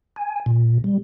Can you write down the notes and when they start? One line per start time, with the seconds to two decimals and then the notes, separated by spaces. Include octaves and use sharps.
0.16 G#5
0.46 A#2
0.84 G3